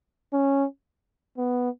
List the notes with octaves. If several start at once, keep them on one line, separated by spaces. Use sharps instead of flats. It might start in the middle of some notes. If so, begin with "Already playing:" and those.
C#4
B3